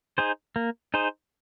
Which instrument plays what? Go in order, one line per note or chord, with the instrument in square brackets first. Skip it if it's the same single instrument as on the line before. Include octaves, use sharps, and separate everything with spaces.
[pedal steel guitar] D#4 G#4 C5
A#3
D#4 G#4 C5